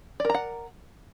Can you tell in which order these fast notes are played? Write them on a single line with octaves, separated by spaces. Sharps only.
D5 A#4 A#5 F#5